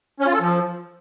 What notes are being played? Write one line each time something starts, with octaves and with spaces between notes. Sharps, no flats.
C#4
F4
A4
F3